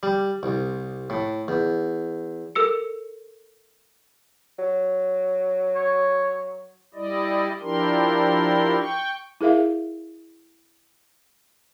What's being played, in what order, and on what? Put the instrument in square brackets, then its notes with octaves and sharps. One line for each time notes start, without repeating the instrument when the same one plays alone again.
[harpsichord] G3
C2
A2
E2
[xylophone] A4 A#4 E6 C#7
[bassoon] F#3
[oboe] C#5
[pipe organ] G3 E4 D5 D#5
F3 D4 E4 G4 A#4 C6
G5 C#6
[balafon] E4 G#4 A#4 E5 F5